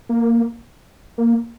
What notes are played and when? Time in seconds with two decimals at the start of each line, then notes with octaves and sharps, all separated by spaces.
0.09 A#3
1.18 A#3